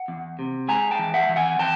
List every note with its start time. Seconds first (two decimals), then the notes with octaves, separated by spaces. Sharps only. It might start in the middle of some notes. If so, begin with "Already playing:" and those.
Already playing: F#5
0.08 E2
0.39 C3
0.68 G#3 G#5 A#5
0.91 G5 A5
0.99 E3
1.14 E5 F#5
1.29 E3
1.36 F#5 G#5
1.59 E3 G5 A5